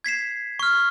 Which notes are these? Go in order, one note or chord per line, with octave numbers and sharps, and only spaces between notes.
G#6 B6 C7 E7
C#6 F6